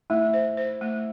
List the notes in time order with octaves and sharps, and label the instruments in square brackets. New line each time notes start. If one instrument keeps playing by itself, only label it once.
[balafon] A3 [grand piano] E4
[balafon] C5
C5
A3